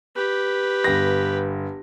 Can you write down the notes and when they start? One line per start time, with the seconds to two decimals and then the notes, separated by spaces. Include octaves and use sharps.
0.16 G4 B4
0.84 G1 A#6